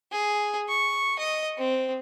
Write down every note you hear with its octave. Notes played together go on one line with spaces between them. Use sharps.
G#4
C#6
D#5
C4